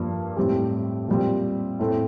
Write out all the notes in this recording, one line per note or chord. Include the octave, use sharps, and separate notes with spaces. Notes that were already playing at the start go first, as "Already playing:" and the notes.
Already playing: G2 F3 A#3 D4
A2 G3 C4 G4
A#2 G3 C4
A2 A3 C4